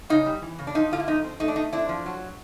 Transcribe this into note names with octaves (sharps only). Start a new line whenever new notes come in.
C#3 D#4
G3
E3
C#3
D4
F3 D#4
D3 F4
E4
F3 D#4
C4
A3 D#4
D4
A3 D#4
C4 D4 E4
F3
F#3